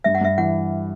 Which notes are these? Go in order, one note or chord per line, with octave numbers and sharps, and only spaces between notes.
G2 E5
F#5
G2 E5
E3 F#5